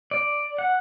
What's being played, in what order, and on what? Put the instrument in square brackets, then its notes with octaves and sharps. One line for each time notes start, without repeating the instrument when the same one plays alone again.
[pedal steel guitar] D5
F#5